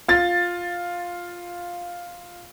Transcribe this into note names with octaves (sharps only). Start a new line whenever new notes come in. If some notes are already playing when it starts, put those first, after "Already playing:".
F4 A6